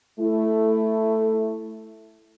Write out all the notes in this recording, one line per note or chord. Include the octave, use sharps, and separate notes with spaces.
A3 E4